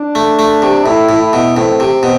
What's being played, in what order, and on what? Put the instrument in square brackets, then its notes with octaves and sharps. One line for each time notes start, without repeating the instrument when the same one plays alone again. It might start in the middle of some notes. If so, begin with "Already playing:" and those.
Already playing: [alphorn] D4
[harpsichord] A3
A3
C3
[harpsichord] A2 [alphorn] E4
[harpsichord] A2
[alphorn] E4
[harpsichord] B2
[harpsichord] A2 [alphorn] C4
[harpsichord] C3
B2